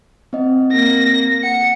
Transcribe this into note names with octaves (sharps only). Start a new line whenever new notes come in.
C4 D#5
A#3 A#6
F#5 C#7